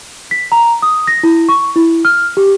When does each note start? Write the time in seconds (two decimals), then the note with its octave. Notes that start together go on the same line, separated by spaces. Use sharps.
0.31 B6
0.52 A#5
0.82 D#6
1.07 A#6
1.23 E4
1.49 C#6
1.76 E4
2.05 F6
2.37 G4